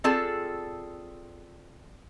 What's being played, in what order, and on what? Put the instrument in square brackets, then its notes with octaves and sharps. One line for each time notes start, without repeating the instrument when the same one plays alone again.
[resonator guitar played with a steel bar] C4 F4 G#4 A4 D5 A5